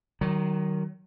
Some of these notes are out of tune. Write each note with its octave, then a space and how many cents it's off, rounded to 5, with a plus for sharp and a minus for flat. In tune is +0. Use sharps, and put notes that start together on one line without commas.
D#3 -15 F#3 +30